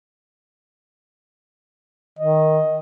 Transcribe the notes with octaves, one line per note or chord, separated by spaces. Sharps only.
D#3 D#5